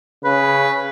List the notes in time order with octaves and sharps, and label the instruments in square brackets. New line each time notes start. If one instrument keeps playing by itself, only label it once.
[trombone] C#3 [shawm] B4